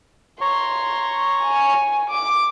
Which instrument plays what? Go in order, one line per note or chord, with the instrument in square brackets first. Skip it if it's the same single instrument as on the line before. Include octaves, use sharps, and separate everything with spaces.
[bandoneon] C#5 A#5 C#6 [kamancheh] C6
[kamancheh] G#5
D6